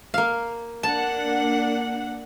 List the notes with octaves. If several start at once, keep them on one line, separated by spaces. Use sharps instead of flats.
A#3 F5
A#3 D4 F#5 A5